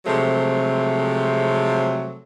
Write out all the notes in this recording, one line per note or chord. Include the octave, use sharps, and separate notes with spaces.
C3 F3 F#3 G#3 A3 C4